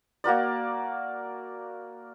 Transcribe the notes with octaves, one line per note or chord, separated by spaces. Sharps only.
A#3 F#4 A#4 D5